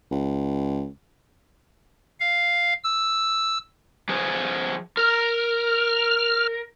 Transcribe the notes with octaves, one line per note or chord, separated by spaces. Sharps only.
C#2
F5
E6
F3 G#4 B4
A#4 F6